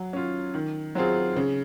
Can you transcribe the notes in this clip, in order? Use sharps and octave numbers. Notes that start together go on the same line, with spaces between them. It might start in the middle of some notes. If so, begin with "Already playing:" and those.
Already playing: F#3
C#4 F4
D#3
F#3 C4 F4 G#4
C#3